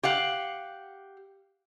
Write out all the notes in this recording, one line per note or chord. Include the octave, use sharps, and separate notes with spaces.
G4 F5 F#5